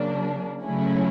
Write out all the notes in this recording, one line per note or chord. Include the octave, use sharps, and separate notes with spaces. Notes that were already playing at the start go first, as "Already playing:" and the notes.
Already playing: C#3 F#3 A#3 D4
C#3 F#3 A3 C#4 E4